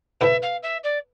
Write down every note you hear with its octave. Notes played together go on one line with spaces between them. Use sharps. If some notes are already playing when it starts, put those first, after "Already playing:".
B2 B3 E4 A4 C5 E5
F5
E5
D5